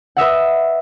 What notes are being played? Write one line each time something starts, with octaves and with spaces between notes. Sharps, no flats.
B4 D#5 E5 F#5